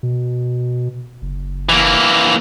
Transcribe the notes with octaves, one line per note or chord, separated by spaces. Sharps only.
B2
F#1
E3 A#3